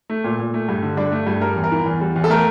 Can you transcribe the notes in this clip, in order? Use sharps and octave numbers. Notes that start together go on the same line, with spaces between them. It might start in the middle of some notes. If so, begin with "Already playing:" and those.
A3
A#2
A#2
A3
G2
D3
G2 D4 D5
A3
G2
G3 A#4
E2
A#4
E3
E2
G3
E2
A4
A3 A#4